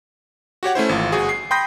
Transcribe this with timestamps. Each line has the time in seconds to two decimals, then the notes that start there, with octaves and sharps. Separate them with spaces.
0.63 F#4 G4 C#5 F#5
0.75 A3 C#4 E4 C5
0.89 G#1 E3 F4
1.12 G1 F#4 G#4
1.29 C7
1.51 G5 B5 C6 D#6 G6 A#6